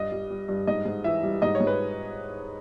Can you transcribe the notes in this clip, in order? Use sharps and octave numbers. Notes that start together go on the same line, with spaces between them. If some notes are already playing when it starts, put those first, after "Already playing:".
Already playing: G2 D#5
G3
G3
G2
G#2 D#5
G#2
E3 E5
G3
G#2 D#5
C#5
G#2
B4